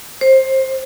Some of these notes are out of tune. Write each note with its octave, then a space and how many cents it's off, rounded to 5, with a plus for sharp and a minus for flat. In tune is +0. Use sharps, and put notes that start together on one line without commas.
C5 +20